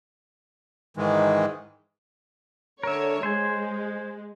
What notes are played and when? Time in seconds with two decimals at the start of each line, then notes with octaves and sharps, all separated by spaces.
0.97 G#2 D#3 E3 G#3
2.83 D3 A#4 C#5 E5
3.23 G#3 C5 G#5